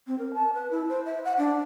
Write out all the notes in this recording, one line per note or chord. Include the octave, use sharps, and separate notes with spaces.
C4
A#4
A5
B4
E4
C5
E5
F#5
D4